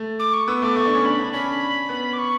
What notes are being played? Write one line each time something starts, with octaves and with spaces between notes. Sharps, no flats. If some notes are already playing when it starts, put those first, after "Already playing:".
Already playing: A3
D6
C#6
B3 E6
A3 D6
A3 C#6
D4
C#4
D4 B5
D4
C#4 B5
B3
D6
C#6